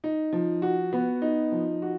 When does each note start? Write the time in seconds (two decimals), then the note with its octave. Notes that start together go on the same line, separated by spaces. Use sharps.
0.04 D#4
0.33 F3
0.62 F#4
0.93 B3
1.22 D#4
1.52 F3
1.82 F#4